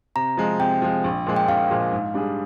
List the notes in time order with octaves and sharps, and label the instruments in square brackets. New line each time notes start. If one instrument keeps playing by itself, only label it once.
[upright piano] C3 [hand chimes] A#5
[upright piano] F3 G#3
[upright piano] C3 [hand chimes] G5
[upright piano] F3 G#3
A#1
A#2 F3 G#3
[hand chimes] G5
[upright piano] A#1 [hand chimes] F5
[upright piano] A#2 F3 G#3
G#2
G3 D4 G#4